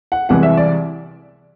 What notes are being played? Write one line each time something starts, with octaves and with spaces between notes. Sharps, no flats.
F#5
C2 C3 E3 G#3 F#5
E5
D5